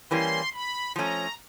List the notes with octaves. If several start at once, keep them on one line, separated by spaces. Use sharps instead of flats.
E3 G3 A#3 C#4 C6
B5
F3 A3 C#4 A#5